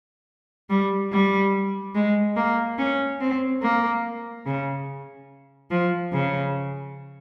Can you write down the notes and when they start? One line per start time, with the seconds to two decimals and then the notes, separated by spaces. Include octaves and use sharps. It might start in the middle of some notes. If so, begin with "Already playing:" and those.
0.70 G3
1.12 G3
1.95 G#3
2.36 A#3
2.78 C#4
3.20 C4
3.62 A#3
4.46 C#3
5.71 F3
6.13 C#3